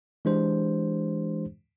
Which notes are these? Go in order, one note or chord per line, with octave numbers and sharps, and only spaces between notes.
E3 G#3 D4 G4 C5